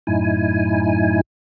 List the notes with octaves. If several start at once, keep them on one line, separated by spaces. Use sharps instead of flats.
F#2 A2 D#4 E4 G#5